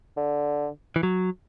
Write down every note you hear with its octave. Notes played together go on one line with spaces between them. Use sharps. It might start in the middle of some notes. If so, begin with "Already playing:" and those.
D3
E3
F#3